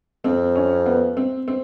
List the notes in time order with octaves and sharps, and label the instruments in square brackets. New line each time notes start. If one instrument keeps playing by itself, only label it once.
[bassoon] F2 [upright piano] C4
[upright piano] C#4
B3
C4
C4